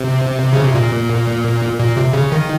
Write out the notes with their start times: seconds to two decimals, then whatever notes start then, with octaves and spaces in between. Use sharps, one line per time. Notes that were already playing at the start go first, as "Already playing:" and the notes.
Already playing: C3
0.53 C#3
0.64 C3
0.75 A#2
1.79 A#2
1.97 C3
2.13 C#3
2.32 D#3